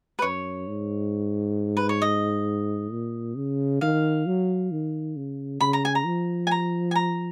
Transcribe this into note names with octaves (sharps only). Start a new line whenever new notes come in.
B4
F#2 C#5
G#2
B4
C#5
D#5
A#2
C#3
D#3 F5
F#3
D#3
C#3
C#3 B5
A#5
G#5
A#5
F3
G#5
A#5
G#5
A#5